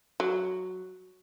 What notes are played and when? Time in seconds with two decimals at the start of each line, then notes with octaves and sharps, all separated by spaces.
0.20 F#3